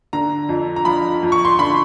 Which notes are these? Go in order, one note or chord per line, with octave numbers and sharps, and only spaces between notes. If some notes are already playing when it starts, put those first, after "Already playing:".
D3 A#5
F2
A#5
F3 B5
F2
C#6
C6
D3 B5